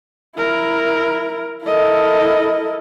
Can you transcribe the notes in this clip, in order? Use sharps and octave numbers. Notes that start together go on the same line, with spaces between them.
E4 A#4
E4 A4 A#4 D#5